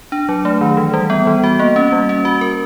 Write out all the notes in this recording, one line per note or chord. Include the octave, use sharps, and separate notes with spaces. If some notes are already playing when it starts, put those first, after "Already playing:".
D4
F#3
A3
D#3
E3
G3
B3
E3
F#4
A#3
C#4
G3
C#4
F#4
A#4